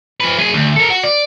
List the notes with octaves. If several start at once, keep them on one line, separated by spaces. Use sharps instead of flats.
F3 B4
F#3 G#4
D2
A4 A#4
F#4
D5